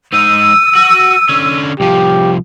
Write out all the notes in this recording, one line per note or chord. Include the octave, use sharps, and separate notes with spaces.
G#2 D#4 E6 D#7
F#4
D3 C#4
C2 F3 G4